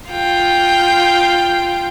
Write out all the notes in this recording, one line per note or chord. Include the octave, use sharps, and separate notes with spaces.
F4 G5